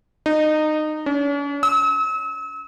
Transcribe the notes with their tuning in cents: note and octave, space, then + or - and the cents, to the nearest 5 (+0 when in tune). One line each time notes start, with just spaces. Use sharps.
D#4 -20
C#4 +45
E6 -40